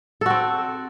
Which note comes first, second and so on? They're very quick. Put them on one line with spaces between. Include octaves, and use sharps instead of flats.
A4 F#4 C4